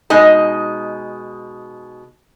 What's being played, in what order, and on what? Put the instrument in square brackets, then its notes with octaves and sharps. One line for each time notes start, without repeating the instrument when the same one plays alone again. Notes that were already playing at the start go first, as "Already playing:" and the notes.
[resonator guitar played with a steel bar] B2 G#3 D#4 D#5 G#5